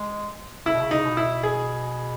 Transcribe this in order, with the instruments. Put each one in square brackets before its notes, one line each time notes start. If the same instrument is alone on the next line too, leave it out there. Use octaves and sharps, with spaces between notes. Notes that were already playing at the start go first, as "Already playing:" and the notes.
Already playing: [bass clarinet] G#3
[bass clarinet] C#3 [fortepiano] E4
[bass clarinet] B2
C#3
[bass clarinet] C#3 [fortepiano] D#4
[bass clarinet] B2
[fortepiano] E4
G#4